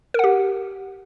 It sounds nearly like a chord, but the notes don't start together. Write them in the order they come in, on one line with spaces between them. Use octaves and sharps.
A#4 F#5 G4